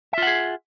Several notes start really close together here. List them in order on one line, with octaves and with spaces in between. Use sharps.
E5 F4 F#5 G#4